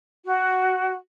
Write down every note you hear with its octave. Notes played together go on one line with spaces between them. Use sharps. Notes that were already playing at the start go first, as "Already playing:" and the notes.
F#4